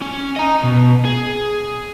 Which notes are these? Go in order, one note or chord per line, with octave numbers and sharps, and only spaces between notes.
C#4
D#5 A#5
B2
G#4